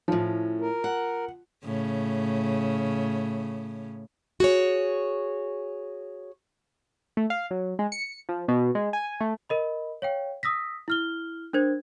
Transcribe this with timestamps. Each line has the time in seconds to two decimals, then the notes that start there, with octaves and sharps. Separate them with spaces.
0.08 A2 F3 C#4
0.61 A#4
0.84 F#5
1.64 A2 C#3
4.40 F#4 G#4 C#5
7.17 A3
7.30 F5
7.51 F#3
7.79 G#3
7.92 C#7
8.29 F3
8.48 B2
8.75 G#3
8.93 G#5
9.21 A3
9.49 A#4 D#5 B5
10.02 C#5 F5 G5
10.43 D#6 E6 A#6 B6
10.88 E4 F6 G7
11.53 D4 A#4 C5 G#6